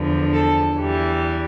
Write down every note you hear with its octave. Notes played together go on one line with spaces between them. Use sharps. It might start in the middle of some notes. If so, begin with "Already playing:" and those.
Already playing: E2 D3 F3
A4
E2 E3 G3